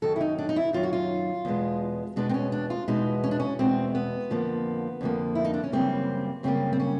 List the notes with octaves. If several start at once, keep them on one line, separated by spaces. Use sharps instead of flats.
F#2 D#3 F#3 A4
E4
D#4
D4
D#4
E4
F#2 D#3 F#3 F4
F#4
F4
E2 B2 G#3 B3
E2 B2 G#3 B3 D4
C4
C#4
D4
F4
E2 B2 G#3 B3 D#4
C#4
D4
C#4
E2 B2 G#3 B3 C4
B3
F2 D3 F3 A#3
F2 D3 F3 A#3
E4
D#4
D4
C#4
F#2 C#3 E3 G3 A#3 C4
F#2 C#3 E3 G3 A#3 C4
C4
C#4